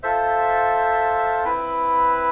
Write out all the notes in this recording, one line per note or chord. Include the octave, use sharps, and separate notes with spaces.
F4 A4 C5 E5
C4 E4 B4